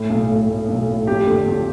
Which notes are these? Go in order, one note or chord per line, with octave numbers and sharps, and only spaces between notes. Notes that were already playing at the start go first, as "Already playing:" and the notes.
Already playing: A2
B1
A2
A2
B1
A2
F2 G4
D3
F2